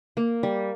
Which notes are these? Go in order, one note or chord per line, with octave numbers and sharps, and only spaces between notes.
A#3
G3